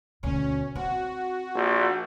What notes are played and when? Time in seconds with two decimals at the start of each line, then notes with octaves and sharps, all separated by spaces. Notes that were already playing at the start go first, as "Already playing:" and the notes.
0.23 D2 B2 C#4
0.76 C4 F#4
1.54 A#1